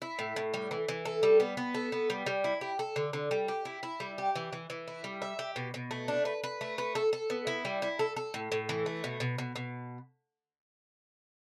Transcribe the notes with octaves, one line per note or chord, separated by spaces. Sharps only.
E4
A2
A2
G3
E3
E3
A4
G3
B3
B3
A4
B3
G3
G3
E4
G4
A4
D3
D3
G3
G4
E4
E4
G3
G4
E3
E3
E3
E4
G3
E5
G4
B2
B2
A3
D4
B4
B4
A3
B4
A4
A4
B3
E4
G3
E4
A4
A4
A2
A2
E3
A3
B2
B2
B2
B2